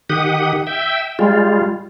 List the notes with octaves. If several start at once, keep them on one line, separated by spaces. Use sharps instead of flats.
D#3 G4 F#5 D#6
E5 G5
G3 G#3 F4